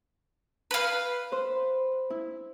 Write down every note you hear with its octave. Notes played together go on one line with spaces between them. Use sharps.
B4 F5
C5
E4